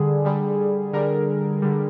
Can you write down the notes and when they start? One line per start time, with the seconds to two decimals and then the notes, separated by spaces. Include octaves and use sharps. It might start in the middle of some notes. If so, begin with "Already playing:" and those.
Already playing: D3 G3 G#4
0.25 D3 G3
0.93 D3 G3 A#4
1.62 D3 G3